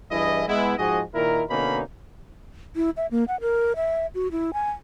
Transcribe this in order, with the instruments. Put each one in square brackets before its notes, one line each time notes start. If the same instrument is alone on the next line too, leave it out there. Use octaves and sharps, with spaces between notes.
[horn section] G2 E3 E4 G#4 D#5
G#3 B3 E4
G#2 F3 F#4 G#4 D#5
A#2 D#3 E4 A#4
B2 D3 A#3 C#4 D#4 B5
[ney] E4
E5
A#3
F#5
A#4
E5
F#4
E4
G#5